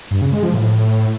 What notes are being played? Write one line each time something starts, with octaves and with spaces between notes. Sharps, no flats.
G2
C#3
G#3
F3
A2